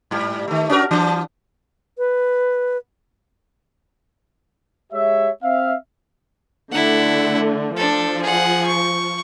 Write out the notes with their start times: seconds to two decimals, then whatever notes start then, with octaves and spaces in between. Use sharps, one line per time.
0.11 G#2 G3
0.48 D#3 A3
0.70 C#4 F#4 A#4
0.91 E3 D4
1.98 B4
4.92 G#3 G4 C#5 E5
5.43 C4 E5 F5
6.72 D3 A3 E4 F#5
7.76 F3 D4 A4
8.21 G#4 F#5
8.66 C#6